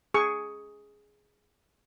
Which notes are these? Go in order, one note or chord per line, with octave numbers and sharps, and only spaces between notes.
G#4 C#6